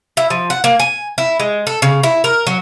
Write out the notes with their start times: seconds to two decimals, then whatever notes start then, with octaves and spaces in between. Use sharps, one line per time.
0.17 E4
0.30 F3
0.50 F#5
0.64 A#3
0.79 G#5
1.18 E4
1.39 G#3
1.67 A4
1.82 C#3
2.03 E4
2.24 A#4
2.47 F#3